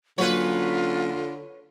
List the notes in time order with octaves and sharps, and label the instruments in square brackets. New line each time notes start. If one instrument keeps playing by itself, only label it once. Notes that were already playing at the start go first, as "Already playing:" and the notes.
[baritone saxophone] D3 [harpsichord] F#3 A#3 C#4 [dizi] F4 [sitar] B4 C#5